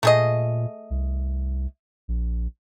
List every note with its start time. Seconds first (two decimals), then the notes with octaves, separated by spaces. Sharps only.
0.03 A#2 A3 G#4 D#5
0.90 C2
2.08 A#1